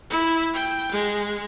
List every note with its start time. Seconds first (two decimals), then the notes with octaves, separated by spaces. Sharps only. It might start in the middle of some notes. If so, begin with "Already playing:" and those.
0.10 E4
0.54 G5
0.92 G#3